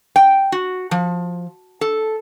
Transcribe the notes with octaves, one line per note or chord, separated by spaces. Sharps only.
G5
F#4
F3
A4